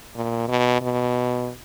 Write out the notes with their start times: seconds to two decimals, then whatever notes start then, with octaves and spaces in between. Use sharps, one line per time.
0.16 A#2
0.48 B2
0.81 B2